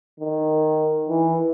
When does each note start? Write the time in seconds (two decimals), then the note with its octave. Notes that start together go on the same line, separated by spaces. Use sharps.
0.20 D#3
1.09 E3